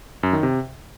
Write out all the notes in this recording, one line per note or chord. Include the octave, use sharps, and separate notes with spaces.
F#2
D#3
C3